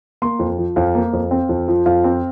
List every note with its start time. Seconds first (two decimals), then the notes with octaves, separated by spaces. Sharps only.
0.22 A#3 C6
0.39 F2
0.58 F3
0.76 F2 F5
0.95 A#3
1.13 F2
1.31 C4
1.49 F2
1.68 F3
1.86 F2 F5
2.04 C4